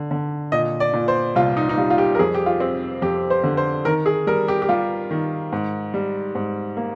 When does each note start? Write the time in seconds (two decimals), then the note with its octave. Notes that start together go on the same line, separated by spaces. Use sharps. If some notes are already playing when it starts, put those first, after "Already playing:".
Already playing: D3
0.11 D3
0.52 A#2 D#5
0.80 D5
0.93 A#2
1.08 C5
1.35 C2 F4
1.57 D#4
1.69 D#4
1.77 G3 F4
1.90 F4
1.98 G4
2.15 A#4
2.19 F2 G#4
2.34 G4
2.46 F4
2.60 C4
3.02 F2 G4
3.30 C5
3.44 D3
3.57 C5
3.85 D#3 A#4
4.06 G#4
4.27 G3 A#4
4.48 G4
4.62 G4
4.69 G3 F4
5.11 D#3
5.52 G#2
5.94 G3
6.35 G#2
6.77 A#3